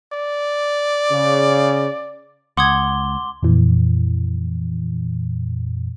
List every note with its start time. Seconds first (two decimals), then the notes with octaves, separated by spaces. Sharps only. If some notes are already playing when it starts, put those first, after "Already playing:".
0.13 D5
1.11 C#3
2.57 C#2 F#5 C6 D6 D#6 G#6 G7
3.43 F2 A#2 E3